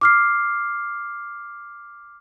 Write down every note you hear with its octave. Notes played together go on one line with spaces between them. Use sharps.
D6 F6 C7